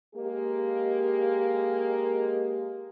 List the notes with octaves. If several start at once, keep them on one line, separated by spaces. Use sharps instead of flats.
G#3 A#3 G4